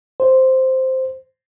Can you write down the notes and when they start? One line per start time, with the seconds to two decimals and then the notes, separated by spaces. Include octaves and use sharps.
0.20 C5